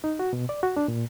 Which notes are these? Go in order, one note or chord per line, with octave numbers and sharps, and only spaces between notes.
D#4
F#4
B2
D5
F#4
D4
A#2